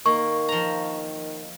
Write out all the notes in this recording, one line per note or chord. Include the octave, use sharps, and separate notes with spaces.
D#3 A#3 C#6
F3 A#5